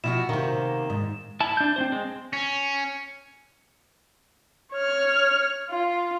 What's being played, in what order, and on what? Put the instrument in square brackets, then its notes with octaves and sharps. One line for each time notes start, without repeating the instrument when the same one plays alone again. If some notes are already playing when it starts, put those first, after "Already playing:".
[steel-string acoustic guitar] B2 F3 F#4 [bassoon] E4 [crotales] E7
[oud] C3 F#4 [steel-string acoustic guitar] D#3 [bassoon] A#3
[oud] G#2
[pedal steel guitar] E4 A5
D4 G6
C4 D4 C5
G#3 C4
[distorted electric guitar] C#4
[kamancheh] C#5 F6
F4